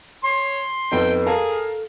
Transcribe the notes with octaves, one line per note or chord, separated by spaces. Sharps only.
C#5 C6
F2 B3 D#4 A4 G5
G#4 A#4 F5 A5